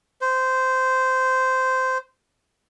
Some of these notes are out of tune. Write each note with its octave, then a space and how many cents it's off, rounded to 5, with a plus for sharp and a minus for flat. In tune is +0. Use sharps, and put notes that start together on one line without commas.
C5 -15